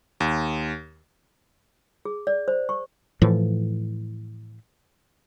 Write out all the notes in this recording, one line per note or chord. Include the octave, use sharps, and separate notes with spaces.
D#2
G#4
D5
C5
C#6
A2 E3 F3